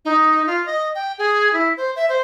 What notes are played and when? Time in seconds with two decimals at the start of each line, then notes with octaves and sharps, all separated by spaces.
0.05 D#4
0.47 F4
0.66 D#5
0.95 G5
1.18 G#4
1.53 E4
1.77 C5
1.96 E5
2.09 C5